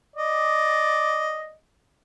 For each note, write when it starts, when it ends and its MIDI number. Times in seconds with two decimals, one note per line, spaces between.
0.16 1.53 74
0.16 1.53 75